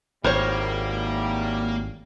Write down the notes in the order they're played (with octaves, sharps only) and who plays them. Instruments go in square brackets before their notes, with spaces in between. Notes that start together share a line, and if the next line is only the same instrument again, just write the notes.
[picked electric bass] G#1 [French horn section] E2 A2 G3 [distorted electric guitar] A#3 [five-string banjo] A#4 C5 C#5